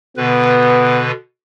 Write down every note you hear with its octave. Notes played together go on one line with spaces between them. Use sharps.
B2 D3 B3 B4